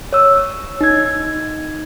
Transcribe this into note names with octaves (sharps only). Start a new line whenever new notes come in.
C#5 E6
D#4 G#6